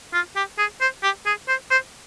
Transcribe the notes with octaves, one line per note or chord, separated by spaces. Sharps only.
F4
G4
G#4
C5
G4
G#4
C5
C5